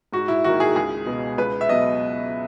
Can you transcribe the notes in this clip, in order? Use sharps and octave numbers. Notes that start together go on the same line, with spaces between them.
G#2 F#4
E4
D#3 A#3 F#4
G#4
C#2 G#4
B2 G#3 B3
C#2 B4
E5
B2 F#3 B3 D#5